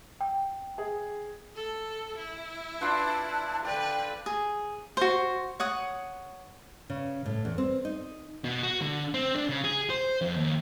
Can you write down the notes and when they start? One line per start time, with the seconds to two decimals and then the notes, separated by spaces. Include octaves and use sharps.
0.21 G5
0.78 G#4
1.55 A4
2.18 E4
2.81 D4 F4 B4 A5
3.65 D3 B4 D5 G5
4.26 G#4
4.97 F#4 C5
5.60 C#5 F#5 D#6
6.90 C#3
7.26 A2
7.45 E2
7.58 C4
7.85 D#4
8.44 B2
8.63 F#4
8.82 D3
9.14 C4
9.36 D4
9.49 C#3
9.64 G#4
9.90 C5
10.21 F2
10.36 D#2